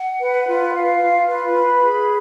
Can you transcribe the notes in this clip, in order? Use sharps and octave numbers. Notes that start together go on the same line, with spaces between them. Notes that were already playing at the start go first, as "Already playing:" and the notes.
Already playing: F#5
B4
F4
F5
F4
B4
B5
G#4